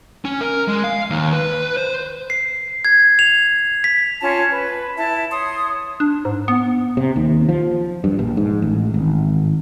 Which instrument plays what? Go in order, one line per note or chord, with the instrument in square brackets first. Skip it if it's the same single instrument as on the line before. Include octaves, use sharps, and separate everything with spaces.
[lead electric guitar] C#4
A#4
G#3
F5
D#2
B4
C5
[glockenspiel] C7
G#6
F7
B6
[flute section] C#4 F4 C#5 A5
B4
E4 E5 A5
C#5 C6 D#6
[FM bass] D4
G#2
B3
[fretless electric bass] C3
D#2
F3
G2
A#1
G#2
A1
G#1